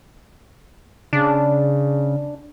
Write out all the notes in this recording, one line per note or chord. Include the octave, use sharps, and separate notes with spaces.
C#3 D4